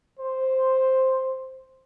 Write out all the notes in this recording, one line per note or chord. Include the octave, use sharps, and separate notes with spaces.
C5